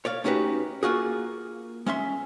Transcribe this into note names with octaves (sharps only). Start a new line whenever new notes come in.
C#5 D5 F5
A3 C#4 D#4 F#4 G4 B4
A#3 F4 F#4 G#4
G#3 C#4 E5 C6